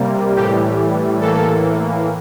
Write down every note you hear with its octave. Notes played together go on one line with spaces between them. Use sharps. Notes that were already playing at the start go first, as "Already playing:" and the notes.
Already playing: C3 G3 A#3
A2 E3 G3 G4
A2 E3 A#3 A4